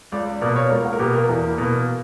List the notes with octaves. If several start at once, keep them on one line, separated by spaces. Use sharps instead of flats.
C#2 D5
B2 A#3 D5
C#5
C#2 A#4
F#4
A#4
B2 A#3 G4
A#4
E2 A#4
B2 A#3